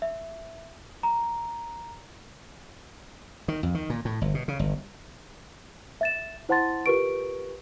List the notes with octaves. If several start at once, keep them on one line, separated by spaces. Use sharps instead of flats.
E5
A#5
D#3
F2
D#3
A#2
A2
G1
B2
C#3
G1
E5 A6 E7
E4 C5 F#5 A5 C6 A6
F4 G4 A#4 B4 C#6 D7